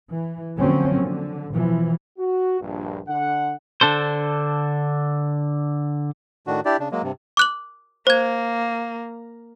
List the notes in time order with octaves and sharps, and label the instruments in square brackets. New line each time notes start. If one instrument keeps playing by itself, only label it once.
[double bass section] E3
D3 F3 F#3 A#3 C4 C#4
D3
B2 E3 F3
[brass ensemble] F#4
A#1 G2
D3 F#5
[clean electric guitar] D3 D4 A4 C5
[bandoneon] A2 D#3 D4 F#4
D4 E4 G4 D5
C#3 D4
F#3 G#3 A#3
G2 C3
[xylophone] D6 F#6 F#7
[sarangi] A#3 [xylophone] C5 G#6